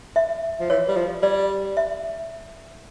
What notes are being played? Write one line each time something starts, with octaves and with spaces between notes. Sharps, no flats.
E5
F3
E3 C#5
G3
F3
G3 D5
E5